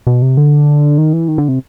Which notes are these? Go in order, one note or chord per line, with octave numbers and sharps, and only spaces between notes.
B2
C3
D3
D#3
E3
D#3
D3
C3